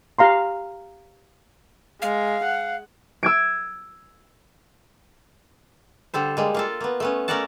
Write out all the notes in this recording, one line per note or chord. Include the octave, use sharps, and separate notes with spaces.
G4 F5 A#5 C6
G#3 F5
F#5
E6 G#6 D7
D3 G3 A4 C5
G3 G#3 A#3
A#3 F4 A4
A#3 B3
A3 B3 C#4
A3 C#4 A#4 D5 F#5 A5